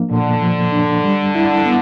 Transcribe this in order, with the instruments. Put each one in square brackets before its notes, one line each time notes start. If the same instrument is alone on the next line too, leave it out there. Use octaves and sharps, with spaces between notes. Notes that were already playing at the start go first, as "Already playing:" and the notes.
Already playing: [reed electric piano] F3 A#3 D4
[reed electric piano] A#2 [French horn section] D3
[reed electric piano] F3
D4
G3
E4
B3